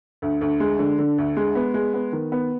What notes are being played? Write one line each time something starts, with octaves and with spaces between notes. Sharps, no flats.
D2
D2
G#3
D3
D3
D2
G#3
B3
G#3
B3
D#3
B3